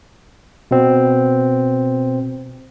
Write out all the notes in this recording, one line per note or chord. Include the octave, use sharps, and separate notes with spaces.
B2 C4